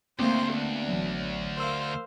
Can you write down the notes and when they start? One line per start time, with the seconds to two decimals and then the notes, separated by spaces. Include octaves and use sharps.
0.19 D2 A3 A#3 C4 C5 C6
0.53 B3 D4
0.89 A1 F#3
1.57 A#4 C5 F5 E6